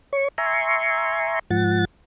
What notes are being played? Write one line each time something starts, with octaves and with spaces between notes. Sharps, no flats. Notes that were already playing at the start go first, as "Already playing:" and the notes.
C#5 C#6
E5 G#5 A#5 C6 C#6
G#2 F3 F#5 A6